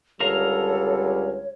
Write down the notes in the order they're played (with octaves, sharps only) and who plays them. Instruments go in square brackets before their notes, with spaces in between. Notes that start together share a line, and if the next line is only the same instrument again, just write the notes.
[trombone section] C#2 D3 G3 [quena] A4 [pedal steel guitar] A#4 F5 A#5 [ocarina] C#5